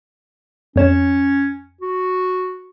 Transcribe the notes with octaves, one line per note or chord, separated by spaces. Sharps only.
F2 C#4 C#5 E7
F#4